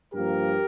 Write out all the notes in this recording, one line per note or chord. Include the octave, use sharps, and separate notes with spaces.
G2 F3 A#3 G4 A#4